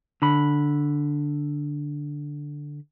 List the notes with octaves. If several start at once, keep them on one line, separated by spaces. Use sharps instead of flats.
D3 B5